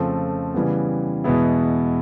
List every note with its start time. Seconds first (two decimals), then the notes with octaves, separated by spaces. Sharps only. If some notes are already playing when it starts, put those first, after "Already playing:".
Already playing: F2 C#3 F3 A3 C4
0.54 C#3 E3 G3 B3
1.24 E2 B2 G#3 B3 E4